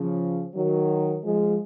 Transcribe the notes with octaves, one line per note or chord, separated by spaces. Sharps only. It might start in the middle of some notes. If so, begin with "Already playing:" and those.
Already playing: C#3 F3
D#3 F#3
F3 G#3